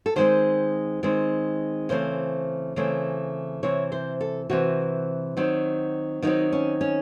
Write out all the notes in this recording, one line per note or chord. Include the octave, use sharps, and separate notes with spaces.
A4
D#3 G#3 C4 C5
D#3 G#3 C4
C#3 E3 A3 C4 C5
C#3 E3 A3 C4
C3 E3 C4 C#5
C5
A4
C3 E3 C4 F#4
D#3 F#3 C4
D#3 F#3 C4 D#4
C#4
C#4